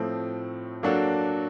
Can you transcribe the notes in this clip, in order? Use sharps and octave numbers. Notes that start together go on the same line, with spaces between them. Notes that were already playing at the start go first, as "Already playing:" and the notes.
Already playing: A2 F3 A3 C4
F#3 A#3 D4 F#4 A4